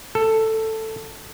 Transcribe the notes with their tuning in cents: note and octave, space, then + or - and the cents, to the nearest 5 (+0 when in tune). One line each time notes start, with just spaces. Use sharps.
A4 +10